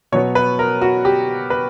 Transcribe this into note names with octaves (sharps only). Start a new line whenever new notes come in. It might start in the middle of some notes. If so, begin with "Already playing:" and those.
B2 F#3 B3 C#5
B4
A#4
F#4
G4
B4